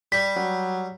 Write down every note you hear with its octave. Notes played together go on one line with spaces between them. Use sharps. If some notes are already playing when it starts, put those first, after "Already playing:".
G3 B6
F#3